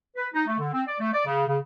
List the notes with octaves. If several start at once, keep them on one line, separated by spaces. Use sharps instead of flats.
B4
D#4
A3
D3
C4
D5
A3
D5
C#3
C#3